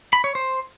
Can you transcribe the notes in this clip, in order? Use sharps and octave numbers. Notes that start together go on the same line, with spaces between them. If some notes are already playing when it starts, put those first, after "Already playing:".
B5
C#5
C5